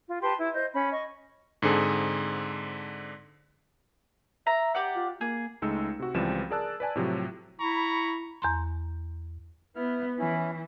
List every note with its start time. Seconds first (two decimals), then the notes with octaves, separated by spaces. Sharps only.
0.09 F4
0.22 G4 B4 A5 C6
0.38 E4
0.54 C5 D#5 G6
0.72 C#4 B5
0.92 D#5 C#6
1.62 G#2 D3 C4 G#4 A4
4.47 E5 A#5
4.75 G4 D5 F#5
4.96 F4
5.21 A#3 G#4
5.62 C#2 G#3 A3 D#4 E6 C#7
5.99 C3 F#4
6.14 C#2 E3 F3 G3 C4 E7
6.50 G#4 A#4 D5 A5 E6 F#6
6.80 B4 D5 G#5 A5
6.95 A2 C3 F3 F#3
7.60 E4 A#5 B5 C#6
8.42 E2 A#5 C6
9.76 B3 E4 B4 F6
10.19 E3 C#4 E4